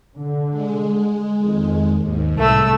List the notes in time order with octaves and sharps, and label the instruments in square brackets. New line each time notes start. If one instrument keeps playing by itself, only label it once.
[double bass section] D3
[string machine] G#3
[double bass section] F2 D#3
[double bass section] D#2 [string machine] G#2
[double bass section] C2 A2 [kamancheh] A3 E6